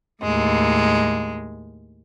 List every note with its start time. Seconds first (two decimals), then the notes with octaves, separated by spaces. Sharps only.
0.21 D#2 A2 G#3